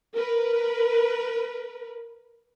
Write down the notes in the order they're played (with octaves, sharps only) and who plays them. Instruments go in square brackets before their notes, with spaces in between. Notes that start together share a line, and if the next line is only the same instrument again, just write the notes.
[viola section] A#4 B4